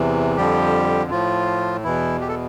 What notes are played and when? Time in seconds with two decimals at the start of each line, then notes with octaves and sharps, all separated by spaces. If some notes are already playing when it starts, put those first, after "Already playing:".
Already playing: E2 C3 E3
0.37 F2 D3 F3 G3 G4
1.11 A2 F3 F4
1.84 E2 B2 E3 E4
2.21 G4
2.28 A4